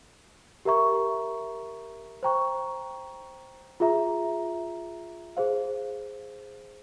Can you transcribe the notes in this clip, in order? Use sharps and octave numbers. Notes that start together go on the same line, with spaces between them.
G4 A#4 E5 A#5 C#6
C5 G5 A#5 C#6
F4 G#4 E5 A#5
G#4 C5 F5